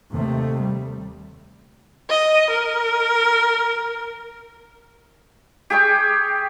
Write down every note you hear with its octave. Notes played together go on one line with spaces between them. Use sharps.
D#2 C3 A3
G3
D#5
A#4
G4 G#4 G5 C#6